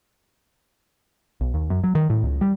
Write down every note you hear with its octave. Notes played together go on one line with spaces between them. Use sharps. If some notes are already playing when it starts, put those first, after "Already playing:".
B1
D#2
F#2
F#3
D#3
A2
C#2
G3